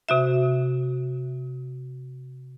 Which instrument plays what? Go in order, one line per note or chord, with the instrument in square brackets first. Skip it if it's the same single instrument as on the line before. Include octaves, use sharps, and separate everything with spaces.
[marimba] C3 F#4 E5